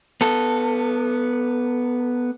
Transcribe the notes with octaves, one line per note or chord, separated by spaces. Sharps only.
B3 A4